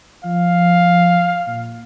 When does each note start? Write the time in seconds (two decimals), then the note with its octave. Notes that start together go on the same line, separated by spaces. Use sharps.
0.24 F3 F5
1.46 A#2